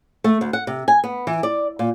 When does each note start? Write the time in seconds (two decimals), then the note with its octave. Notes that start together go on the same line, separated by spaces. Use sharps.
0.24 A3
0.41 D2
0.53 F#5
0.67 C3
0.88 G#5
1.04 B3
1.27 E3
1.43 D5
1.79 A#2